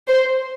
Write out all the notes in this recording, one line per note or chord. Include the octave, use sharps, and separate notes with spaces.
C5